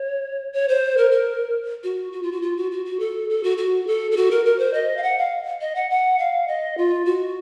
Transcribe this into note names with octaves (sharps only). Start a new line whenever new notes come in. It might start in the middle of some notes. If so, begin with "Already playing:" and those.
Already playing: C#5
C#5
C5
A#4
A#4
F#4
F#4
F4
F#4
F4
F#4
F#4
F#4
A4
A4
F#4
F#4
A4
A4
F#4
A#4
A#4
C5
D#5
F5
F#5
F5
D#5
F#5
F#5
F5
D#5
F4
F#4